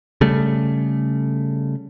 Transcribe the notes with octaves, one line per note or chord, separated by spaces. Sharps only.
C#3 G3 A3